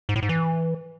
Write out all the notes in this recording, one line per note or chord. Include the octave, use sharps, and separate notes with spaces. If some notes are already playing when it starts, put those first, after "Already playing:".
G#2
A2
G#2
E3